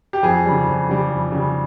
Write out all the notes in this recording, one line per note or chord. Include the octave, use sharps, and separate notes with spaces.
G4
F2 G#4
C#3 G3
F2
C#3 G3
F2
C#3 G3